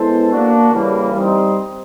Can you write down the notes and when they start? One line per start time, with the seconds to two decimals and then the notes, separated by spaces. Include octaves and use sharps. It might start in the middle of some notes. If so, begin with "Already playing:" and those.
Already playing: G#3 B3 E4 A4 C5
0.31 A#3 D4 F#4
0.72 C#3 E3 G3 A#3
1.15 G3 C4 D#4